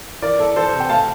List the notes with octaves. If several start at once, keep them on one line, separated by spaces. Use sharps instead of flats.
E3 A#4 D5
E4 A4
E3 A4 C5
C3
G5
A3 F5 A5